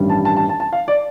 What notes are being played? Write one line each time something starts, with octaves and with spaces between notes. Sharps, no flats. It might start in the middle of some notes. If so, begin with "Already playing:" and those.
Already playing: A1 G2 D#3 G3
A5
A5
A5
A5
A5
F5
D5